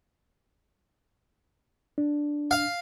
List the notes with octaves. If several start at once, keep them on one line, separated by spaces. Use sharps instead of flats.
D4
F5